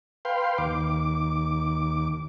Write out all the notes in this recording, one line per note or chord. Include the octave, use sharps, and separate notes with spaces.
B4 F5 G5 C6
D#2 D6